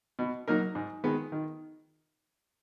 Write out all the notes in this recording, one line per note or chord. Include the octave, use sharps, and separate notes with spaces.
B2
F#3 A#3 D#4 A#4
G#2
D#3 G#3 B3
D#3